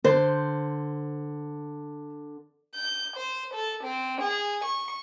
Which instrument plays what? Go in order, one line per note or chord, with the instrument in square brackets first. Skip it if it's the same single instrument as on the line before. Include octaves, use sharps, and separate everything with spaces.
[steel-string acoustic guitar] D3 [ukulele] C5
[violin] G6
C5
A4
C4
G#4
C#6